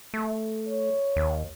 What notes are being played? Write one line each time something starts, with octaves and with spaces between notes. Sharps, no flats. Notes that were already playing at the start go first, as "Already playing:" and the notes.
A3
C#5
D#2